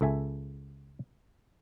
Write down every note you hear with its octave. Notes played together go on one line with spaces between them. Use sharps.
C#2 A4 E5 G#5